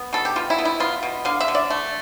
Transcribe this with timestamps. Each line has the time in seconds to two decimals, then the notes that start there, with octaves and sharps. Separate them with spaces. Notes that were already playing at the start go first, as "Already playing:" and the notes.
Already playing: B3
0.13 B2 A4
0.25 G4
0.36 B2 F4
0.50 E4
0.58 B3
0.65 E4
0.80 B3 F4
1.03 B2
1.25 D3 F5
1.40 E5
1.48 D3
1.55 D5
1.70 A3